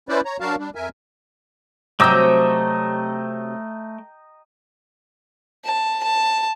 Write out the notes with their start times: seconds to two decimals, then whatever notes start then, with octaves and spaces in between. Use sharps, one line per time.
0.09 C#4 E4 B4 C5 D5
0.25 C#5 A#5
0.40 F#3 D4 F#4 A#4 F5 A5
0.59 G3 D4
0.75 F2 A#4 E5 G#5
2.00 C3 F#3 A3 D#5 G5 A#5 D6 E6
5.65 A5
6.03 A5